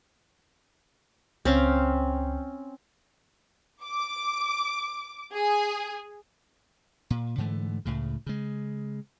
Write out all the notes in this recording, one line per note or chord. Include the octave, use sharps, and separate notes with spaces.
C#2 C4 C#4 F5
D6
G#4
A#2
G#2 D3 E3 A3
C#2 A2 C#3
C#3 G#3